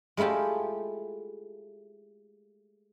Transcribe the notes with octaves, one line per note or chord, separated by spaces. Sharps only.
G#3 A3 E4 F4 G4